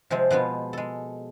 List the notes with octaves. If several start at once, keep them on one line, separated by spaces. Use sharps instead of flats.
C3 F3 G#3 C4
B2 F3 G#3 B3 F4
G#3 A4